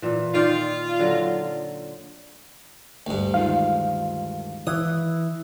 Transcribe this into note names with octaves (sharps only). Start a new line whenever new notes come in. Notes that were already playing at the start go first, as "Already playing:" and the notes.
A#2 E3
D#3 F4 D5 F5
D3 F#3
D2 G2
D#3 G#3 F4 F5
E3 D#6